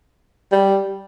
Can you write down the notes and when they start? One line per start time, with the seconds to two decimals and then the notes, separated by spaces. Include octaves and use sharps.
0.52 G3